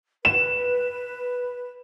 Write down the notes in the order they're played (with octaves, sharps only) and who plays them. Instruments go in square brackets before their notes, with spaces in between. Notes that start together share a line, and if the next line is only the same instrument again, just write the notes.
[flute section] B4 [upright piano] E7